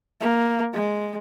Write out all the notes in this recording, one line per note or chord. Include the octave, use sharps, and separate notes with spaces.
A#3
G#3